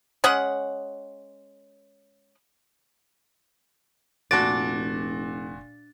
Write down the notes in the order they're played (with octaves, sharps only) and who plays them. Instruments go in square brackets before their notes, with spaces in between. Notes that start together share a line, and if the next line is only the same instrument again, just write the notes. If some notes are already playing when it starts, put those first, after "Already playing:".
[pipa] G#3 C#4 D#5 F#5
[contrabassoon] F1 [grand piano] A#2 F#4 D7 [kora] D4 D5 [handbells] A6